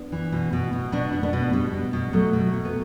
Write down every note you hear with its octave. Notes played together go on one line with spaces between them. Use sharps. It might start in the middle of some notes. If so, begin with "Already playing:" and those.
Already playing: B3 D4
E3
B2
B2
B2
B2 B3 D4
B2
B3 D4
B2
B2 G3
B2
B2
B2 F#3 A3
B2
B2
B3